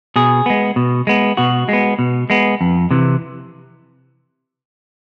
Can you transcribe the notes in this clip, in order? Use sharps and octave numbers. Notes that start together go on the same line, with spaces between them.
B2 G#4
G#3 B3
B2
G#3 B3
B2 F#4
G#3 B3
B2
G#3 B3
F2
C3 E3